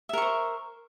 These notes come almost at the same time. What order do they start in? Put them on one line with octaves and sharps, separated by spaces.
E5 A#4 C#6 C5